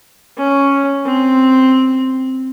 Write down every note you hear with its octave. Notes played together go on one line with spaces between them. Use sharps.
C#4
C4